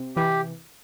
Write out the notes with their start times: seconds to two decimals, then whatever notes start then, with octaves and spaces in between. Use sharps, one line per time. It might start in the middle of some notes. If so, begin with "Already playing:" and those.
Already playing: C3
0.16 E3 G4